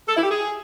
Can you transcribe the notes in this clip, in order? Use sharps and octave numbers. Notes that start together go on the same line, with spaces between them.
A4
E4
G4
G#4